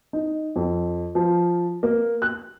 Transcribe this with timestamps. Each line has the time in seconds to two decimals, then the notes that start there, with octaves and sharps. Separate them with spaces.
0.13 D#4
0.56 F2
1.15 F3
1.83 A#3
2.22 F#6